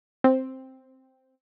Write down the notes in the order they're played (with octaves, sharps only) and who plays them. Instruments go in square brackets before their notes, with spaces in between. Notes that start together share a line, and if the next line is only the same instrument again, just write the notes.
[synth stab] C4